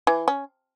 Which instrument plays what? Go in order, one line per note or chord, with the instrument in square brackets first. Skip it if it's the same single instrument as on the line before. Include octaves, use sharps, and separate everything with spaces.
[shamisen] E3
C#4